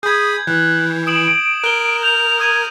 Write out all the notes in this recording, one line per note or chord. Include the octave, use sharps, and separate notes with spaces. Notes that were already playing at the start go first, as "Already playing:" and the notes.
G#4 B5 D#6 G6 G#6
E3 F#6
D#6 D7 E7 F#7
A#4 F#6 G7
G6 F7
D#6 G#6 D#7 F7